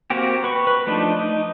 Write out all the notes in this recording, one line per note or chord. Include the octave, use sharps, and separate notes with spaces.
A#3 C4 F#4 G4
B4 C#6
B4
F3 A3 D4 D#4
D#4